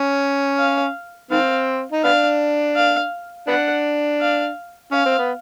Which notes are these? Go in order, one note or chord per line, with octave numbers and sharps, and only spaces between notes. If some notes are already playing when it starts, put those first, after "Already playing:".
Already playing: C#4
F5
D#3 C4 F5
D#4
B3 D4 F5
F5
B3 D4 F#5
F5
C#4 F5
C4
B3